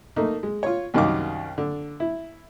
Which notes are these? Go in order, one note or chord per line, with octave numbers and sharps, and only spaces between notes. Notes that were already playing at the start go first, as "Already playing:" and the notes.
A3 A#3 D#4
G#3
F4 C#5
C2 F#2 D#3 D#4 F5 D6
D3
E4